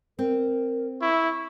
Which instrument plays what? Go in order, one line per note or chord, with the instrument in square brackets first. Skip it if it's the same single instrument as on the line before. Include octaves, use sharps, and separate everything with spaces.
[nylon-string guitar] C4 [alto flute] A#4
[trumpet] E4 [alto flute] C#6